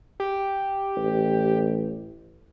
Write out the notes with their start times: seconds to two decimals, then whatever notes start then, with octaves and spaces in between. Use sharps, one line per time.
0.20 G4
0.96 A1